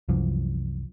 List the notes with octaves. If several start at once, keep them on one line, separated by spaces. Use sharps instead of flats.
C2 F#2 E3 F3